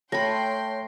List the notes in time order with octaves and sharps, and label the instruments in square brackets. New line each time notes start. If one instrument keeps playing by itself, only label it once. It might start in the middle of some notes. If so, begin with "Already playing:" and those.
[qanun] A3 B5 [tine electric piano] C#5 A5 [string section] G5 C6 [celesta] A#6